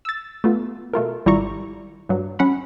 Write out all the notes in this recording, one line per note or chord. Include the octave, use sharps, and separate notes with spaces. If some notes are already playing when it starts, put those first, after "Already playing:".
E6 A6
A3 B3 F4
B2 A3 F4 A#4
G#1 G3 E4 F4 A#5 C#6
G2 F#3
F#3 C#4 F#5 B5